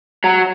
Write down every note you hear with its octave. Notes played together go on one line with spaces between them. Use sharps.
F#3